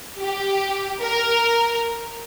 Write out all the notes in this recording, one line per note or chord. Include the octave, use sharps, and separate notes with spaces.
G4
A#4